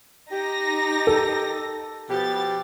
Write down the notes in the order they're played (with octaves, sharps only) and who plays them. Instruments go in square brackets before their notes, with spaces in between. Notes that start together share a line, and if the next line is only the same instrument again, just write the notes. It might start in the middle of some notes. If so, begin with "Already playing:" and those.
[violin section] D#4 A#6 [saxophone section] G4
[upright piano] A4
[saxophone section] B2 F3 G4 [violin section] B3 A6